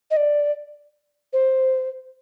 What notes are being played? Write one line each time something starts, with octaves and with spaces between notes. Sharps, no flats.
D#5
D5
C5